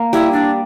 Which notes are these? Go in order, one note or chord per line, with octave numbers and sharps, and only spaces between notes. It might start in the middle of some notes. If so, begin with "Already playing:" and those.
Already playing: A#3
G3 E4
D4